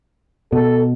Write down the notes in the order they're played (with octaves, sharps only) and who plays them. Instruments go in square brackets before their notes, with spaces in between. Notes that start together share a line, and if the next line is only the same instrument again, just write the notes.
[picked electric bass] B2 [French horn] A4